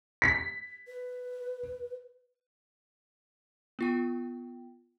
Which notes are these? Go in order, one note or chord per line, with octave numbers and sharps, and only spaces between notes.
B6
B4
B3 F4 G5